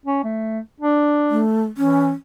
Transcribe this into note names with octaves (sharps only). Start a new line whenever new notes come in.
C#4
A3
D4
A3
E3 C#4